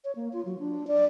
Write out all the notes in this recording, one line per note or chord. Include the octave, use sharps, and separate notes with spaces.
C#5
A#3
F4
F#3
D4
D5